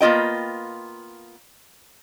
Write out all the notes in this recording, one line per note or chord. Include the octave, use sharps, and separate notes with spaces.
A#3 B3 F4 D#5 G5